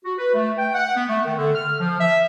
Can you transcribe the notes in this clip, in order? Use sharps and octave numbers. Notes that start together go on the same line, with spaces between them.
F#4
B4
A3
G5
F#5
B3
A3
D#3
D3
F6
F3
E5